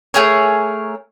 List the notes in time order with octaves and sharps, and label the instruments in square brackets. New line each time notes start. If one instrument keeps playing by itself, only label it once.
[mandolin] A3 G#4 A#4 C#5